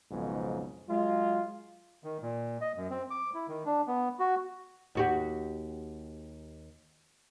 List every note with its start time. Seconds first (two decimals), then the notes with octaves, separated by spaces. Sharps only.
0.11 B1 F2 G#2 C#3
0.88 F#3 G#3 F4
2.04 D#3
2.22 A#2
2.61 D#5
2.77 F#2
2.90 C4
3.11 D6
3.34 E4
3.48 D#3
3.66 D4
3.88 B3
4.19 F#4
4.95 D#2 F#4 G4